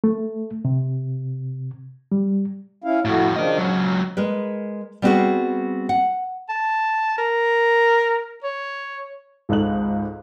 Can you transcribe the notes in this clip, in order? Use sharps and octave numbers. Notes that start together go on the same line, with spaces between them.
A3
C3
G3
C#4 E4 F5
F2 A2 A3 E4 F#4
C#3 F3 D4 A#4 D#5
C#2 F#3 C#4
G#3 A#4 B4
G3 B3 C4 D4 F#4 G#4
F#5
A5
A#4
C#5
G#1 C#2 D#4 A4 F#6 F#7